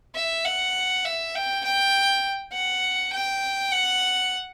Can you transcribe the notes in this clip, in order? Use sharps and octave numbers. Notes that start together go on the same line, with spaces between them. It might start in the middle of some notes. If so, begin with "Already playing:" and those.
E5
F#5
E5
G5
G5
F#5
G5
F#5